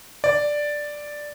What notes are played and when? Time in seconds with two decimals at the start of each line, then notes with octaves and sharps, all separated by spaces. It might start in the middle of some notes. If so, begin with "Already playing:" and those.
0.24 D5